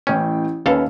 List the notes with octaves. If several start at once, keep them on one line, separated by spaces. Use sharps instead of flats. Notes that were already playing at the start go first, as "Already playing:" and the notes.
A1 E3 C#4 G5
D#2 C#4 A4 B4 F5